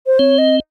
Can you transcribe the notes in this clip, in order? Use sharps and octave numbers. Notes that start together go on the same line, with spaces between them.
C5
C4 C#5
D#5